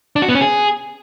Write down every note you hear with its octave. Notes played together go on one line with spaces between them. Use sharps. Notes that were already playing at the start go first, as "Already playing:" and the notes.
D4
F#4
B3
C#4
G#4